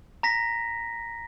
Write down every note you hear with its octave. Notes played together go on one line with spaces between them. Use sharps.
A#5 A#6 B6